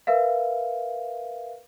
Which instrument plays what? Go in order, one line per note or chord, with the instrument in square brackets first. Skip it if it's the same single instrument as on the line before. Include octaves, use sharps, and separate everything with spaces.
[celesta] A#4 B4 E5 F5